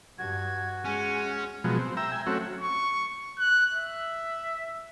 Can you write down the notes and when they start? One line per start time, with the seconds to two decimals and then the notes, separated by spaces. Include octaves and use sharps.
0.18 G2 F#4 G#6
0.85 G#3 C#4 G#5
1.64 B2 F3 F#3 G#3
1.78 C4
1.97 E5 G5 A#5 E6
2.12 E5 G5 G#5
2.26 F#3 A3 C4 C#4 F#4
2.61 C#6
3.39 F#6
3.73 E5